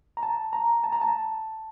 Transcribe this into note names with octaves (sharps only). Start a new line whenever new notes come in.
A#5
A5
A#5
A5
A#5
A5